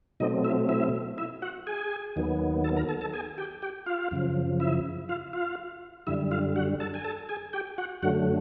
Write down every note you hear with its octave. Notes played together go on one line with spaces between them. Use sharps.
B2 F#3 A3 C4 D#4 D#5
E4 E5
E4 E5
E4 E5
F#4 F#5
G#4 G#5
D#2 D#3 F#3 B3
A4 A5
A#4 A#5
A4 A5
A4 A5
G#4 G#5
G4 G5
G4 G5
F4 F5
F#2 C#3 F3
E4 E5
F4 F5
F4 F5
F#2 D3 G3 E4 E5
F4 F5
F#4 F#5
A4 A5
G#5
A4 A5
G#4 G#5
G4 G5
F#4 F#5
F#2 D3 F#3 A3 F#4 F#5